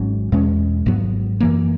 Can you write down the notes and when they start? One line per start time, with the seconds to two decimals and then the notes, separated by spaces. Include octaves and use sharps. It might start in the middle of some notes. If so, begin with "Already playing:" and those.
Already playing: G#1 G#2 F#3 C#4
0.32 E2 B2 G#3 C#4
0.86 G#1 G#2 F#3 B3
1.40 F#2 E3 A#3